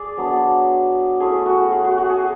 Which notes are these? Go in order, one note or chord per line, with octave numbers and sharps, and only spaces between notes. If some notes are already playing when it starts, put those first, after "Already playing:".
Already playing: G#4 D5
F#3 B3 D4
A3 C#4 E4 G#4
F#4
G#4
F#4
F#4
G#4